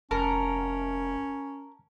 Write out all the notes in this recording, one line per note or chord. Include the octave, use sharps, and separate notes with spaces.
F1 C#4 A#4 A5